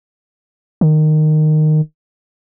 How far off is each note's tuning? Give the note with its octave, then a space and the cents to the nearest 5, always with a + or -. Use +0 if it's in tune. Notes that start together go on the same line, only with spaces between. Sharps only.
D#3 -15